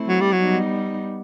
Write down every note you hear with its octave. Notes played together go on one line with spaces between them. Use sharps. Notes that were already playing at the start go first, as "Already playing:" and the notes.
Already playing: A3 C4 E4
F#3
G3
F#3
G3 B3 D#4